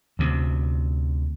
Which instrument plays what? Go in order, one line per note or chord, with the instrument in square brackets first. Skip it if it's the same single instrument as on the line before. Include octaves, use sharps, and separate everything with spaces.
[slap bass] D2 C3